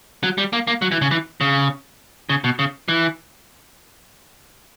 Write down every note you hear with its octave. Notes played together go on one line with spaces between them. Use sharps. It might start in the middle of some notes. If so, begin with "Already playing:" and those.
F#3
G3
A#3
A#3
F#3
E3
C#3
E3
C#3
C#3
B2
C#3
E3